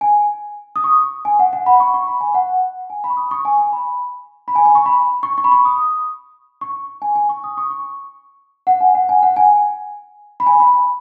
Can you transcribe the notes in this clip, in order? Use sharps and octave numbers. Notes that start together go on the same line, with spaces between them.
G#5
D#6
C#6
G#5
F#5
F#5
B5
C#6
C#6
B5
G#5
F#5
G#5
B5
C#6
D#6
C#6
G#5
G#5
B5
B5
G#5
G#5
C#6
B5
C#6
C#6
B5
C#6
D#6
C#6
G#5
G#5
C#6
D#6
C#6
C#6
F#5
G#5
F#5
G#5
F#5
G#5
B5
G#5
B5